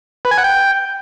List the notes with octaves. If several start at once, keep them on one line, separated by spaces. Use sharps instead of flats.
B4
G#5
F#5
G5